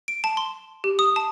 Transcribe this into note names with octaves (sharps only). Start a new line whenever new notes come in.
D7
A5
C6
G4
D#6
A5